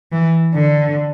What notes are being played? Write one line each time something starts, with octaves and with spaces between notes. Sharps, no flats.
E3
D3